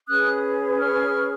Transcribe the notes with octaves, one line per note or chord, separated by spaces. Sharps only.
C#4 G#4 B4 D#6 F#6
C#6 F6